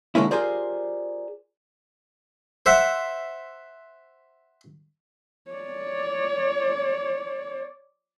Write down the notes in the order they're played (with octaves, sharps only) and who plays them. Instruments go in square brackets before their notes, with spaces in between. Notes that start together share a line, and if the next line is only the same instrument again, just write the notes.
[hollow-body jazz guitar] D3 G#3 A#3 C#4 E4
F4 G4 G#4 A#4 C5 D5
[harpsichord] C5 E5 F#5
[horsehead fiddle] C#5 D5